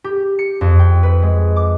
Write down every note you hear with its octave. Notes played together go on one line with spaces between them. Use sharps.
G4
C#7
F2
G5
B4
G#3
D6